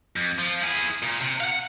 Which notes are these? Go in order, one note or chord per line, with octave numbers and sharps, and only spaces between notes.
F2
F3
E4 G#4
A#2
C3
F5 F#5